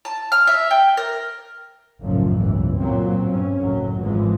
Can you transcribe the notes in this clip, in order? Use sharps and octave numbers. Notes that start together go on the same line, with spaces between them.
A5
F6
E5
G5
A#4
F#1 B1 F#2 A2 F3
G1 C#2 E3
A#2 F#3 C4
G2 C#4
F#1 D2 A2 F#3
G#1 G#2 E3 F3 G#3